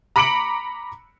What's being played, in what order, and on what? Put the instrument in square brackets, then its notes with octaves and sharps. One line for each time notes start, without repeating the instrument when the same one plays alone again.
[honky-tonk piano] A#5 B5 D6 C#7 D7 F#7